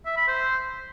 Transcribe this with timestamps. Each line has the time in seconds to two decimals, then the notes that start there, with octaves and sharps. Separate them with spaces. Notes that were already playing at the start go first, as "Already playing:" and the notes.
0.06 E5
0.17 B5
0.28 C5